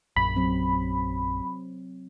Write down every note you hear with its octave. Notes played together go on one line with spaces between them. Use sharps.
A#1 F#2 B5
F#3 C4